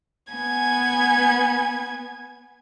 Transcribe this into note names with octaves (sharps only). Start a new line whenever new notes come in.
B3 G#5 G#6